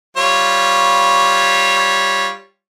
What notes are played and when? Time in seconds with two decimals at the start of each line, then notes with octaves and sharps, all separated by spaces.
0.17 G3 F4 C#5